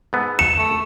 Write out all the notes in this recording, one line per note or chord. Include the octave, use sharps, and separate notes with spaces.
G#2 B3 A4
C#7 E7
A3